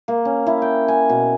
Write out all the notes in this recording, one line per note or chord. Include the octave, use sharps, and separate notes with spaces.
A#3
C#4
E4
G5
G#5
B2